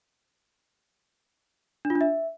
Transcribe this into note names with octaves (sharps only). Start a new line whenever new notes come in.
D4
F4
D4
E5